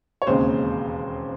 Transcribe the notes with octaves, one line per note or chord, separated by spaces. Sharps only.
C#5
E1 D#2 C#3 G#3 C4 C5